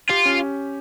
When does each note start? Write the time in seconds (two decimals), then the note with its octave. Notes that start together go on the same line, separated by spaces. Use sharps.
0.10 F4 G4
0.25 C#4